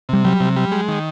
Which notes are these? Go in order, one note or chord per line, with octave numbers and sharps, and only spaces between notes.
C3 G3
F#3 G3
C3
G3
G#3
D#3